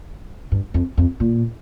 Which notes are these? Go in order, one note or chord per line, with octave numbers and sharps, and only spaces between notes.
G2
F2
F2
A#2